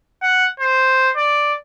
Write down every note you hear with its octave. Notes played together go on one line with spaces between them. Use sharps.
F#5
C5
D5